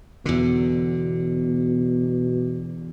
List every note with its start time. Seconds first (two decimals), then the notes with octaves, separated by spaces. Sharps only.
0.26 E2 B2 D3